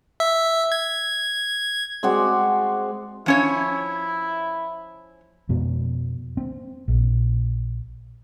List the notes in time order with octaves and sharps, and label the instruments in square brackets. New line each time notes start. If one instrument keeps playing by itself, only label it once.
[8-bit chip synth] E5
G#6
[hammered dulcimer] G#3 C4 F#4 D5
[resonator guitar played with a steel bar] F3 C#4 C#5 [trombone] E4
[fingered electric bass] F2 B2
C4
A#1